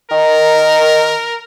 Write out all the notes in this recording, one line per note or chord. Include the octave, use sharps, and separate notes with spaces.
D#3 A#4